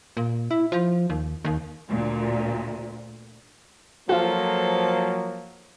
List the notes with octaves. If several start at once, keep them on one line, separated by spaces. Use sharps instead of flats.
A#2
E4
F3
D#2
D#2
D2 A#2
F3 F#3 A#3 F4 F#4 A4